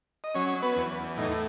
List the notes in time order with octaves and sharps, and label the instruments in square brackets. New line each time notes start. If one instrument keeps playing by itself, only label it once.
[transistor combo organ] D#5
F#3 C#4 C#5
B3 B4
E2
A2 D#4